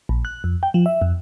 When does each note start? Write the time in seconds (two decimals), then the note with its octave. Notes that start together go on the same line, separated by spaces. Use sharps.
0.09 A#1
0.25 F#6
0.44 F2
0.63 G5
0.74 F3
0.86 E5
1.02 F2